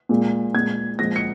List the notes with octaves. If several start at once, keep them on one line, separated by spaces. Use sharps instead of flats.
A#2 G#3
A#2 G#3 G#6
A#2 F3 G#3 A#6
C#7